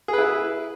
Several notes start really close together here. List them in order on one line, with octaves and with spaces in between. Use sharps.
G#4 B4 E4